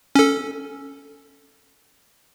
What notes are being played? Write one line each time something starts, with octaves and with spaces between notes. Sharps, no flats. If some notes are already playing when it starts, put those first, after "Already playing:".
C#4 A4